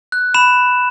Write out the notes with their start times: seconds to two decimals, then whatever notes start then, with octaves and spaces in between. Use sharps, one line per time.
0.12 F#6
0.34 B5 E7